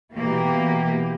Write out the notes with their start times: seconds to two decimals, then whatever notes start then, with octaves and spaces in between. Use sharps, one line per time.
0.15 B2 E3 A#3 G4